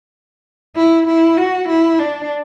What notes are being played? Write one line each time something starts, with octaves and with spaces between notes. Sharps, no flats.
E4
E4
F#4
E4
D4